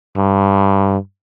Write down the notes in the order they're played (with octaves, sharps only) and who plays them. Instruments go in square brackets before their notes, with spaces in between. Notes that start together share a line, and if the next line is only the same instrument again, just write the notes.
[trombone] G2